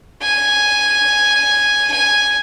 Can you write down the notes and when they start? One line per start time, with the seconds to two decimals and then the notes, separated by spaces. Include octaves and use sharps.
0.22 G#5
1.91 G#5